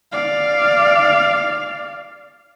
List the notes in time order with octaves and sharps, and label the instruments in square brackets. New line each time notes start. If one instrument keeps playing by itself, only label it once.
[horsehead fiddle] D5 F5